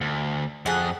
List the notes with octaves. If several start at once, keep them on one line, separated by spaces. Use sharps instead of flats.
D2
F2 G#4 F#5